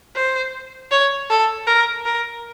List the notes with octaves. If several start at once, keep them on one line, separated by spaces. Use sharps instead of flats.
C5
C#5
A4
A#4
A#4